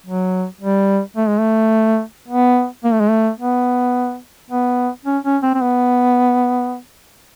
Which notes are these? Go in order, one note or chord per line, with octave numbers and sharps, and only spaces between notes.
F#3
G3
A3
G#3
A3
B3
A#3
A3
G#3
A3
B3
B3
C#4
C#4
C4
C4
B3